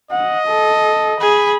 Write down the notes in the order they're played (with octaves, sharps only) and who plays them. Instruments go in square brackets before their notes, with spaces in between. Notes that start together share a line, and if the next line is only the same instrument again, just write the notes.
[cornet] D#5 [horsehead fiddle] F#5
[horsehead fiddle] A4
[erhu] G#4 [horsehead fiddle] B5